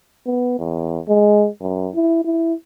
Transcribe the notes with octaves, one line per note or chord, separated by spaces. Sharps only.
B3
E2
G#3
F#2
E4
E4